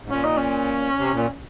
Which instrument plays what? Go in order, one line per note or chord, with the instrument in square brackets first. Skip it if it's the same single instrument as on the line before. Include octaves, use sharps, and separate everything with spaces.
[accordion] G#2
[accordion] A#2 [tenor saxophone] C#4
[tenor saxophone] D#4
C#4
[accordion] C3
A#2